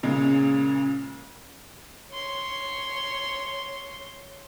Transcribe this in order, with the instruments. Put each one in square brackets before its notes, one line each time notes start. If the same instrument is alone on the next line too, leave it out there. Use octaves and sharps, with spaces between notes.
[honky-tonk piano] A#2 C#3 G#3
[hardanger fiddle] C#5 C6